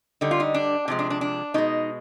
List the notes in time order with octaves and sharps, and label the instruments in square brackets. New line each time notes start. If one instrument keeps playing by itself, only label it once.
[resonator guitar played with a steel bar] D3 G3 D#4
F4
D#4
D4
C3 F3 G#3
D4
D4
D4
B2 G#3 D#4